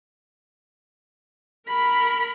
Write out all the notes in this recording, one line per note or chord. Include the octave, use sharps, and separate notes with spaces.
A#4 B5